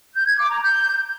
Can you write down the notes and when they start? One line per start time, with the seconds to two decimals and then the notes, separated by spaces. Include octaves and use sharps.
0.14 G6
0.26 G#6
0.38 D6
0.50 A#5
0.62 G6